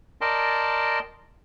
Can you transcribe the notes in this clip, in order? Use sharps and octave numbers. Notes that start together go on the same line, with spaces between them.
A#4 D5 D#5 G5 A5 C6